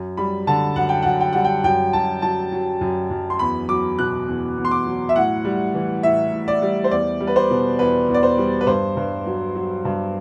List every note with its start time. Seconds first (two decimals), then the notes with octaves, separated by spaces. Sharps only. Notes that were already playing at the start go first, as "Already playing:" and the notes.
Already playing: F#2
0.17 G3 B5
0.47 D3 A5
0.76 F#2 F#5
0.89 G5
1.02 F#5
1.06 F#2
1.21 G5
1.33 G3 F#5
1.44 G5
1.64 F#2 G5
1.93 F#2 A5
2.22 F#3 A5
2.52 F#3
2.81 F#2
3.10 F#2
3.30 C6
3.39 E2 B5
3.69 F#3 D6
3.99 B2 F#6
4.28 E2
4.58 E2
4.65 C6
4.71 D6
4.86 F#3
5.09 E5
5.16 A2 F#5
5.45 G3
5.74 E3
6.03 A2 E5
6.33 A2
6.48 D5
6.62 G3
6.84 C5
6.91 E2 D5
7.20 G3
7.27 B4
7.36 C5
7.50 B2
7.79 E2 B4
8.08 E2
8.14 D5
8.23 C5
8.38 G3
8.61 B4
8.67 G2 C5
8.97 G2
9.26 F#3
9.55 F#3
9.85 G2